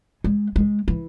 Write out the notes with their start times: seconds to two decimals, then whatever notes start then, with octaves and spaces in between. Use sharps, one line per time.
0.24 G#3
0.56 G#3
0.88 E3